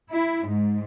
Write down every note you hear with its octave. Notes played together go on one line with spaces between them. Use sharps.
E4
G#2